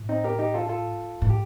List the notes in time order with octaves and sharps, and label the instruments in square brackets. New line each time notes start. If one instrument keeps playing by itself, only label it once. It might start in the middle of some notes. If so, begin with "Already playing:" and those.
Already playing: [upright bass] A2
[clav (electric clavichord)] C4 D#4
G4 A#4
D#4 G4
F4 A4
F4 A4
[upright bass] A2
[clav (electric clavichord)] G4